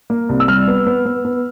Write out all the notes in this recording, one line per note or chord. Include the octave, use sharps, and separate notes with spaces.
A#3
C2
E6
G3 F6
B3
B3
B3
B3